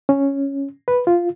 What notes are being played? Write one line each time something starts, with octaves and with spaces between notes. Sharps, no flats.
C#4
B4
F4